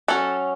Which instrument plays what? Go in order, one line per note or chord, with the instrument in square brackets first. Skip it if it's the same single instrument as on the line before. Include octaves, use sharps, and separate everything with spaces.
[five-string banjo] F#3 C#4 A4